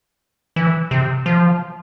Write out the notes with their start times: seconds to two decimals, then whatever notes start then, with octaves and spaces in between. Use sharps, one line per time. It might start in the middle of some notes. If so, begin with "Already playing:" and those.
0.56 E3
0.91 C3
1.26 F3